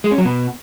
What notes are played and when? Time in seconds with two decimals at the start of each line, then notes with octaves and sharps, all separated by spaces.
0.04 G#3
0.11 C#4
0.18 F#3
0.25 B2